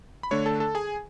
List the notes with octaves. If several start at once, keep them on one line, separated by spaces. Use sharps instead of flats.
B5
D3 A3 D4 C#5 C#6
A4 A5
A4 A5
G#4 G#5